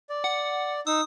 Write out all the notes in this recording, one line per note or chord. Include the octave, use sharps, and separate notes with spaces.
D5
F#5
D#4 D#6 E6